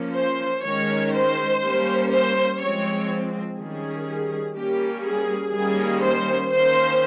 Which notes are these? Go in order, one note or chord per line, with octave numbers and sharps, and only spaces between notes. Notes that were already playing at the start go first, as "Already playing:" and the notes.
Already playing: F3 A#3 C#4
C5
D#3 G#3 C#4 C#5
C5
G3 A#3 C#4
C5
F3 G#3 C4 C#5
D#3 G3 C#4 G#4
G3 A#3 C#4 G4
G#4
D#3 G3 A#3 C#4 G#4
C5
D#3 A#3 C#4 C5